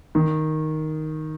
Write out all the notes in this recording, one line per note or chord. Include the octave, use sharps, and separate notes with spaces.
D#3